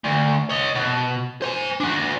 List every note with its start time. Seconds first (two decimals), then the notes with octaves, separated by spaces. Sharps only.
0.05 D2
0.49 C#5 D#5
0.76 B2
1.42 C5 G#5
1.80 D4 F#4